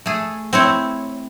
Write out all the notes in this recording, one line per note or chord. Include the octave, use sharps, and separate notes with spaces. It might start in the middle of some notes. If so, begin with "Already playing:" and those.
A3 G#4
C4 E4 C#5